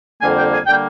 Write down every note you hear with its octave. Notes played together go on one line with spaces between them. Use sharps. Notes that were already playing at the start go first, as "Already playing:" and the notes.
F2 D3 G3 A#3 G#5
G5
G#5
D3 G3 A#3 G5